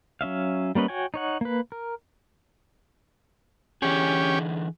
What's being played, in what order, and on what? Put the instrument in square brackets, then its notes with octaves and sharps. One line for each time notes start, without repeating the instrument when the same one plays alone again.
[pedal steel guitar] F#3 C#4 E5 F5
G3 A#3 C#4 B4 D#5
F#4 C#5 G5 G#5
D#4 C#5 F#5
A#3 B4
A#4
[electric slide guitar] D3 E3 G#4 [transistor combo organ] C#4 G4